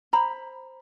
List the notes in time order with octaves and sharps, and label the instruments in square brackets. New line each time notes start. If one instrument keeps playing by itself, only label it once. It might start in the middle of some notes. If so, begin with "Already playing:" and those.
[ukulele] C5 A#5 B5